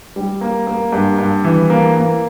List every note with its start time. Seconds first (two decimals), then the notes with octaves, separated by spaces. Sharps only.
0.16 G3
0.41 A#3
0.67 A#3
0.93 G2
1.19 G2
1.44 E3
1.70 A#3
1.96 A#3